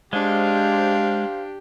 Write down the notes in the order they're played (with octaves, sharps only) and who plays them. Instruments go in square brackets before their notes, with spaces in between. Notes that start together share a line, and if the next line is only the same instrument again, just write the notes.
[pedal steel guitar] G#3 [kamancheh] D4 [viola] G4 [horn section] C5 F5